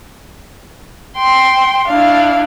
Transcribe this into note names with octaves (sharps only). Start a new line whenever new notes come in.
G5 C6
D4 E4 F5